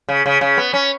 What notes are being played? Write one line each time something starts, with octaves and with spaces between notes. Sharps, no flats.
C#3
C#3
C#3
B3
C#4